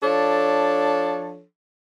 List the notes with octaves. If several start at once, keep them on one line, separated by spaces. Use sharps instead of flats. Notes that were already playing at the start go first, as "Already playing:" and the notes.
F3 D4 A4 C#5